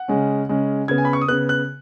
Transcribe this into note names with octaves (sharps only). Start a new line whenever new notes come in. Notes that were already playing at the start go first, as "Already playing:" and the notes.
Already playing: F#5
C#3 G#3 C#4
C#3 G#3 C#4
C#3 B3 G#6
G#5
B5
C#6
D#6
C#3 B3 F#6
F#6